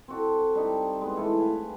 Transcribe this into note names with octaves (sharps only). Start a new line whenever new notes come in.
C4 F#4 A4
G3 D4 D#4 G4
G#3 B3
A2 E3 A4 C6
B4 F5 G#5